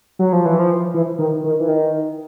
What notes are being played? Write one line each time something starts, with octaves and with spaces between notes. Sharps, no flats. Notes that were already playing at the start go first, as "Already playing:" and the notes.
F#3
F3
E3
F3
E3
D#3
D#3
E3
D#3